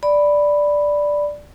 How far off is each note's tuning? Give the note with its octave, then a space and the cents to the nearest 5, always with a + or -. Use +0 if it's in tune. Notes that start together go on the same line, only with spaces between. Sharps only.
D5 +0 B5 +0